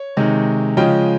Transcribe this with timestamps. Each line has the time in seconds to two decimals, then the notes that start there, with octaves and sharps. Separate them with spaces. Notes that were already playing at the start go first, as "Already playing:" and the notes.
Already playing: C#5
0.17 C3 D#3 G#3 D#4
0.77 C#3 F3 G#3 C#4 F4 D#5 G5